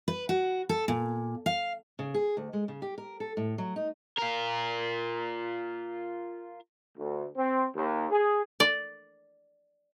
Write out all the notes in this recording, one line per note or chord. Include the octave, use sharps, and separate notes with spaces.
B4
F#4
A4
A#2
F5
C#3
G#4
D2
G#3
C#3
G4
A#4
A4
A2
F#3
D#4
F4 A#4
D2
C4
D#2
G#4
D5